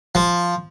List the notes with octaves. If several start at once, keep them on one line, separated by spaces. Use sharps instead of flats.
F3